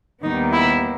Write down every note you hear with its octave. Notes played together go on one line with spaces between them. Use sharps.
D#2 D#3 G3 B3 D#4
E4